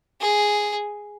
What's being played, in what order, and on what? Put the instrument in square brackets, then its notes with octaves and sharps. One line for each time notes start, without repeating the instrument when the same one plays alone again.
[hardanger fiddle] G#4